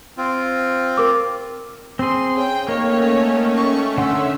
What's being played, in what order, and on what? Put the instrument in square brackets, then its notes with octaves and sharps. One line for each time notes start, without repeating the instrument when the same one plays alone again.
[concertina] C4 F4
[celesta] A#4 D6
[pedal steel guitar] C4 G#4 [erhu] C6
[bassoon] C#3 [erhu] G5
[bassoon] D#3 [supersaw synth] A3 C#4 [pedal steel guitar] A#3 [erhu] C#5
[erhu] C#6
[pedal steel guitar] D3 F#5 C6 [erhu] E5